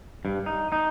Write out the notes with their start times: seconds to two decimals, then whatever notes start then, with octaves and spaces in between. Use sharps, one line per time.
0.25 G2
0.46 D#4
0.72 D#4